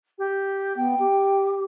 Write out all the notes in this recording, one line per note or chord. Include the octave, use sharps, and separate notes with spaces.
G4
B3 G5
G4